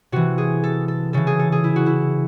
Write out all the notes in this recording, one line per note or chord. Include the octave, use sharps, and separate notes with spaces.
C3 E3 F#4
G#4
A4
A4
C#3 E3 A4
G#4
A4
G#4
E4
F#4
E4